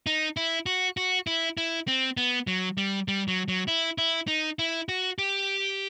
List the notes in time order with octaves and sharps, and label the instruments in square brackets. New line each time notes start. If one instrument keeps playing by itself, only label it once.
[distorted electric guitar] D#4
E4
F#4
F#4
E4
E4
C4
B3
F#3
G3
G3
F#3
F#3
E4
E4
D#4
E4
F#4
G4